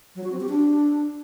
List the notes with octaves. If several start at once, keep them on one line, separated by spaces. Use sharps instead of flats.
F#3
F#4
C4
G4
D4